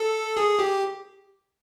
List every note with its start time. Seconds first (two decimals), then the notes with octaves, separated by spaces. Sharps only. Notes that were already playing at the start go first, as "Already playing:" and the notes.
Already playing: A4
0.37 G#4
0.59 G4